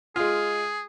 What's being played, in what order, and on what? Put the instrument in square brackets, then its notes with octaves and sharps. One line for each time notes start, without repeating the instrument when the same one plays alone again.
[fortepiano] G#3 F4 [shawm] G#4